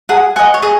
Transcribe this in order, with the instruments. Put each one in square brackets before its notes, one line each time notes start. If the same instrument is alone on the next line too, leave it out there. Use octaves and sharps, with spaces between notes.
[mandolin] G#4 [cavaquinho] F#5
[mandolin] D#5 F#5 [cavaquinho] G#5
[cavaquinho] C#5
[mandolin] G#4 [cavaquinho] D#5